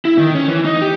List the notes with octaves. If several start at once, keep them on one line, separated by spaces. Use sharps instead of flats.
E4
D#3
C#4
E3
D#4
G4